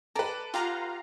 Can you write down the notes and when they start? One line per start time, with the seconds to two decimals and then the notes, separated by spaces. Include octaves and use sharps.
0.15 A4 B4 D5 A#5
0.54 F4 G4 F5 F#5 A#5